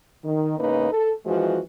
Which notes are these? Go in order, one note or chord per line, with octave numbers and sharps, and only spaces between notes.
D#3
E2 G#2 C#3 A#3 D#4 B4
A4
F#2 E3 F3 G#3 F#4